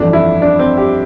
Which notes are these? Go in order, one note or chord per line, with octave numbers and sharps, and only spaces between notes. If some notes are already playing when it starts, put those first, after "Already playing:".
Already playing: G1 F2 E3 A3 D4
E4
D4
C4
G4